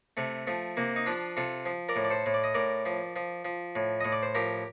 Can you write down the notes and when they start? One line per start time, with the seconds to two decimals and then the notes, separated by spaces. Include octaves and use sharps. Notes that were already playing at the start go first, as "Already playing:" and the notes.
0.17 C3 A3
0.47 F3 A3
0.77 C3 A#3
0.96 D#4
1.06 F3 D4 F4
1.37 C3 F4 A4
1.66 F3
1.89 A#4 D5
1.96 A2
2.04 D5
2.10 A4 C5
2.26 A2
2.34 D5
2.44 D#5
2.54 A2 A#4 D5
2.86 F3
3.16 F3
3.45 F3
3.76 A2
4.00 A2 D#5
4.12 D5
4.23 C5
4.35 F3 G4 A#4